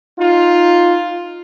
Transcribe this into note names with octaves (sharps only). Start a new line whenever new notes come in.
D#4 F4